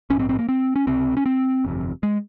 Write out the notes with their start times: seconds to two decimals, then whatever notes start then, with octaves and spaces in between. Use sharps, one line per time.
0.10 A#1 C#4
0.14 G#2 C4
0.29 C4
0.39 A#3
0.49 C4
0.76 C#4
0.87 C#2 C3 C4
1.17 C#4
1.26 C4
1.65 G1 F2 C3
2.03 G#3